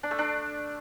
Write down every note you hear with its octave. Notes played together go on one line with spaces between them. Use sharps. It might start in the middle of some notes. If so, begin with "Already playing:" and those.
D4
A3
D4